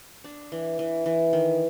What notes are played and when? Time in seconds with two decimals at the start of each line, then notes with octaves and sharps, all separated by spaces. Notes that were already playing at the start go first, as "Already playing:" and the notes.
0.24 D4
0.52 E3
0.79 E3
1.06 E3
1.33 D#3